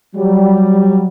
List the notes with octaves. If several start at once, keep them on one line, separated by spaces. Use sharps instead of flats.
F#3 G3